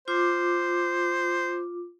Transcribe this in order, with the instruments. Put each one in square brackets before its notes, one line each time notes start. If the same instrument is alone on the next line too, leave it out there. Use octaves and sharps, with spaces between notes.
[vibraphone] F4 D6 [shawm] C5